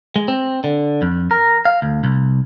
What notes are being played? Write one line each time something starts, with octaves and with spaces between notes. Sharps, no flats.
G#3
C4
D3
F2
A#4
F5
D2
C2